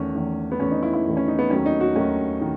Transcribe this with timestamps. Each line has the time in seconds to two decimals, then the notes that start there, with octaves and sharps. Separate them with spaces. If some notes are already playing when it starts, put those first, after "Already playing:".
Already playing: E2 D#3 A3 C#4
0.15 E2 D#3 A3
0.52 B3
0.60 E2 D#3 A3 C#4
0.71 D#4
0.83 E4
0.94 E4
1.05 E2 D#3 A3
1.17 C#4
1.28 D#4
1.39 B3
1.50 D#2 D#3 F#3 A3 C#4
1.66 D#4
1.81 F#4
1.96 D#2 D#3 F#3 A3 C#4
2.41 D#3